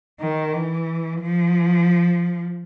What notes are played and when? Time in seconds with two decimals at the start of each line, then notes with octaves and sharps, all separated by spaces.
0.20 D#3
0.53 E3
1.21 F3